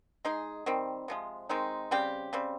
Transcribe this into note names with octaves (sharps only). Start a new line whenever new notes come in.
G#3 D#4 G#4
D#3 G3 C4
C3 F3 G#3
D#3 G#3 C4 D#4
C#3 G3 C4 G4
C#3 G3 C4